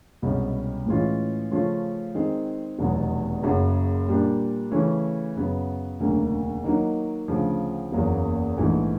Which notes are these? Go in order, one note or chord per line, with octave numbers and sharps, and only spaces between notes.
C2 B2 G#3 C#4
A2 E3 G#3 C#4 F4
C#3 F3 A3 C#4 F4
D#3 G#3 C4
F1 E2 B2 F#3
F#1 F#2 C#3 F#3
A#2 G3 A#3 D4
C#3 E3 A3 C#4
F#2 C#3 F#3 B3
E1 D2 C#3 F#3 A#3
D#3 F#3 A#3 D#4
D2 C#3 F3
F#1 E2 C#3 F#3 A#3
A#1 G#2 E3 A3